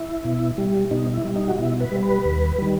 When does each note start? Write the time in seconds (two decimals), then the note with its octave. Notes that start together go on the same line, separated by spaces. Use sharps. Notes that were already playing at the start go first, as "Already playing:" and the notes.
Already playing: E4
0.25 B2
0.58 G3
0.91 B2 D#4
1.14 E4
1.25 G3
1.36 D#4
1.48 F#4
1.58 B2 E4
1.80 B4
1.92 G3
2.03 B4
2.25 D#2
2.58 D#3 G3